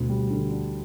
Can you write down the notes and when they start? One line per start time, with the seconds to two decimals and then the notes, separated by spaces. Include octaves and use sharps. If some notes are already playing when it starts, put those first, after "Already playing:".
Already playing: D2 B2
0.09 G3
0.30 D3
0.51 D4